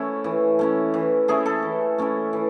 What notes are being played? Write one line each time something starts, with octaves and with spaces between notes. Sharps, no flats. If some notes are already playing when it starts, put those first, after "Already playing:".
Already playing: A3 C#4 E4
E3
A3 C#4 E4
E3
A3 C#4 E4 G#4
A4
E3
A3 C#4 E4
E3